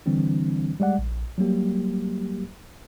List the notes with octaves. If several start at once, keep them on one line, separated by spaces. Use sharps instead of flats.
D3 E3 G3 C4 D4
G3 G#3 D5 F#5
A#1
F#3 G3 A#3 G4